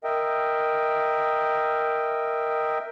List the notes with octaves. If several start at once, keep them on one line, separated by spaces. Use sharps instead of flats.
A#4 D#5 E5 G5